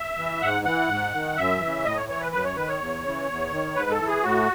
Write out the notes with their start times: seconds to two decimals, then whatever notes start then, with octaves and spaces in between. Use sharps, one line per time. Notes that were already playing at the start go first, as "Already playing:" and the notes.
Already playing: E5
0.18 E3
0.41 G#2 F#5
0.65 E3 F#5
0.89 G#2
1.13 D#3
1.37 F#2 E5
1.60 E3
1.66 C#3
1.85 A2 D#5
1.97 C#5
2.08 E3 C#5
2.21 B4
2.32 F#2 B4
2.44 C#5
2.56 D#3 B4
2.68 C#5
2.80 E2
3.04 C#3 E3
3.28 E2
3.52 D#3
3.75 G#2 B4
3.91 A4
3.99 E3
4.08 G#4
4.23 A2 F#4